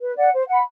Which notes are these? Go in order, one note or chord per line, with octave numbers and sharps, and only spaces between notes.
B4
D5 F#5
C5
F#5 B5